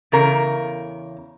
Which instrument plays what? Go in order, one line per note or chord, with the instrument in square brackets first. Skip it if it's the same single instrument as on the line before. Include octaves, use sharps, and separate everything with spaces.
[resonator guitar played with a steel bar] E2 C#3 A#4